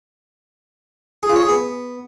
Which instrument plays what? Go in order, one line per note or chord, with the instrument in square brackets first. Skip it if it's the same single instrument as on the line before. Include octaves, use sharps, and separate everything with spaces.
[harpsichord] G#4
F4
C#5
G#4
B3